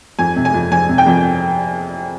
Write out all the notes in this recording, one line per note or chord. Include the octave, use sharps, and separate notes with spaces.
F2 G#5
C3
G#5
F2
F2 G#5
C3
G5
F2